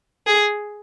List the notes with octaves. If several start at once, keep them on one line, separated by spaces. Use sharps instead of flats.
G#4